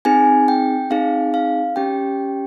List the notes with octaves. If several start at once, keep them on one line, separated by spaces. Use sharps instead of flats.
C4 D#4 G#4 G#5
G5
C4 D#4 G#4 F5
F5
C#4 G4 G5